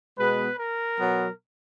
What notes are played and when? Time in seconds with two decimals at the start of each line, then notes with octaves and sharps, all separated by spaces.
0.18 B2 G#3 B3 B4
0.58 A#4
0.98 B2 F#3 B3